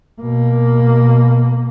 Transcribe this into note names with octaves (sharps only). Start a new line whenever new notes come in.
B2 A#3